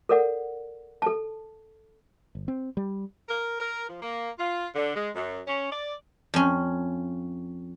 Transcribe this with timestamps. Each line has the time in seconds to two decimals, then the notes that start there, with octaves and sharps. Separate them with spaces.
0.09 A4 A#4 D5 F#5
1.02 A4 A5
2.35 G1
2.48 C4
2.77 G3
3.29 A#4
3.60 A#4
3.89 F3
4.01 A#3
4.39 F4
4.75 D3
4.95 G#3
5.14 F#2
5.47 C#4
5.71 D5
6.34 F2 C#4